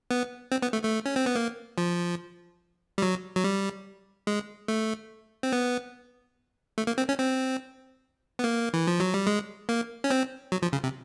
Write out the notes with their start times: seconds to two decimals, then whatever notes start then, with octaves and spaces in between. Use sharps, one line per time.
0.11 B3
0.52 C4
0.62 B3
0.73 A3
0.83 A3
1.06 C#4
1.16 C4
1.26 B3
1.35 A#3
1.78 F3
2.98 G3
3.02 F#3
3.36 F#3
3.44 G3
4.27 G#3
4.68 A3
5.43 C4
5.53 B3
6.78 A3
6.87 A#3
6.98 C4
7.09 C#4
7.19 C4
8.39 B3
8.44 A#3
8.74 E3
8.87 F3
9.00 F#3
9.14 G3
9.27 G#3
9.69 A#3
10.04 C#4
10.11 C4
10.52 F#3
10.62 F3
10.73 C#3
10.84 C3